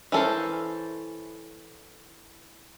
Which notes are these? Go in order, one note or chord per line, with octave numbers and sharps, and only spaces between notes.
E3 C#4 A4 A#4 C5